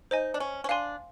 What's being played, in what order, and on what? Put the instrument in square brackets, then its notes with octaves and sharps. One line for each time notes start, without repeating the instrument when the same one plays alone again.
[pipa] D#4 [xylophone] C5 D#5 G#5
[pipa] D4
C#4
C#4
[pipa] D4 [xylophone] F5 G#5 C6